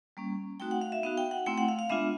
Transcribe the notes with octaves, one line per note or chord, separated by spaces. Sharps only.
G3 A#3 C#4
A3 C4 D#4 F#4 G5
F#5
F5
E5
B3 D#4 F#4 F5
G5
F#5
A3 C4 E4 G5
F#5
F5
F5
G#3 B3 D4 F4 E5